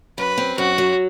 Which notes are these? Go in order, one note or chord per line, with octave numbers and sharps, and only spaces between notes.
F#2 B4
C4
F#2 F#4
F#3